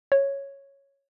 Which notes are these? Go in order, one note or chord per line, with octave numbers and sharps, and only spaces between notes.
C#5